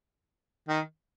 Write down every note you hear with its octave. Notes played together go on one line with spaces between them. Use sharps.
D#3